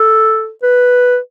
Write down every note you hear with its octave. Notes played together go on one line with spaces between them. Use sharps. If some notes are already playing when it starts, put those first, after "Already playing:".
Already playing: A4
B4